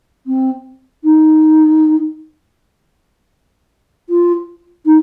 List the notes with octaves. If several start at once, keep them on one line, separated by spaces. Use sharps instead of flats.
C4
D#4
F4
D#4